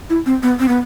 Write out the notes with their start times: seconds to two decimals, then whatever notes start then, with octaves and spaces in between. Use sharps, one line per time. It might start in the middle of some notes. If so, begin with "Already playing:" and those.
0.10 E4
0.26 C4
0.43 B3
0.60 C4
0.68 B3